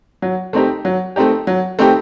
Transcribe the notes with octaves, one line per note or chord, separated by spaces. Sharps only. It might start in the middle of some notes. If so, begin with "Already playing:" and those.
F#3
A3 C4 D#4 G4
F#3
A3 C4 D#4 G4
F#3
A3 C4 D#4 G4